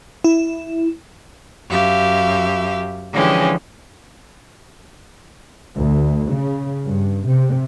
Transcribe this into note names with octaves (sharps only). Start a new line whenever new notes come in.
E4
F#2 G4 E5 F5
D3 E3 F3 G#3 C#4 G4
D2
C#3
G2
C3